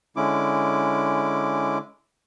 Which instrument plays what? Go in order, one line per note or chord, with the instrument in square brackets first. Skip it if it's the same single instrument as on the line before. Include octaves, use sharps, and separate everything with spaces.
[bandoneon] D3 G#3 C#4 E4 D6